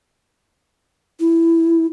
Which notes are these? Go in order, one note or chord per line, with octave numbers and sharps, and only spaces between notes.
E4